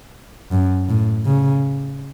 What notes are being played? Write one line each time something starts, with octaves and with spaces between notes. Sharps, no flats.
F#2
A2
C#3